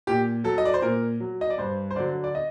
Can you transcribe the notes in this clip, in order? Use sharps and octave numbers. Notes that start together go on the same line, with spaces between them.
A#2 G4
F#3 A4
D#5
D5
C5
A#2 A#4
F#3
D#5
D5
G2 C5
C5
D3 F#3 D5
D5
D#5